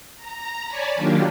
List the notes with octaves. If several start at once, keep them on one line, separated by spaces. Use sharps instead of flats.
A#5
C#5 D5 G#5 A5 B5
D#3 F#3 A#3 D4 F4 G4